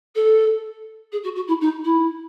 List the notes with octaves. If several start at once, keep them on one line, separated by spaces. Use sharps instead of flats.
A4
G#4
F#4
F#4
E4
D#4
E4